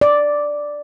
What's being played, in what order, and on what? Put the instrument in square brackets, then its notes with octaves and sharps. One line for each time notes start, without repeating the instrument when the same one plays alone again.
[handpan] D5